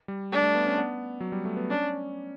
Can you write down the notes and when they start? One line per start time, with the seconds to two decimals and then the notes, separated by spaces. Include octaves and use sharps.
0.08 G3
0.32 A3 D4
0.43 A3
0.55 B3
0.67 C#4
0.78 B3
1.21 F#3
1.32 G3
1.45 A3
1.57 B3
1.70 C#4 D4